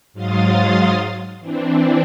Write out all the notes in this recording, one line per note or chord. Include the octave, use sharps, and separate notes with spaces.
G#2 F#3 F5 C6 D#6 A6
E3 C4 D4